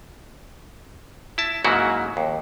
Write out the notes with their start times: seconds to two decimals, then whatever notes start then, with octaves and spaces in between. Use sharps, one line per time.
1.38 E4 A5
1.64 G#2 C#3 F#3 A#3 E4 F#4
2.17 D#2